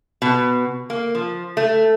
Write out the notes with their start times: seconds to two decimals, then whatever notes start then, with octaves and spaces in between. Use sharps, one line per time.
0.22 B2
0.90 A#3
1.15 F3
1.57 A3